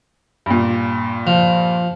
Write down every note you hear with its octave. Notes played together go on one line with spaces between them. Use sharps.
G2 A#2
F3